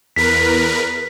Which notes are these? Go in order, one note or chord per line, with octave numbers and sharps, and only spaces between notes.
E2 A#4 B4 B6